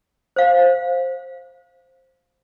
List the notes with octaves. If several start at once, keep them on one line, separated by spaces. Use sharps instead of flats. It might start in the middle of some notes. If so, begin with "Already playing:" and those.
C5 F5